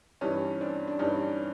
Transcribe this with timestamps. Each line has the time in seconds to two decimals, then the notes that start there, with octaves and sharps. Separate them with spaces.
0.21 G2 E3 G3 C#4 D#4
0.61 C4 D4
0.88 D4
0.99 G2 E3 G3 C#4 D#4